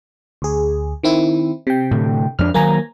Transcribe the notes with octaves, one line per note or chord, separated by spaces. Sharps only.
D2 G#4
D#3 C4 E4
C3 G5
A2 D3
F2 B3 D4 F6
D#3 F#3 A#3 G#5 A#5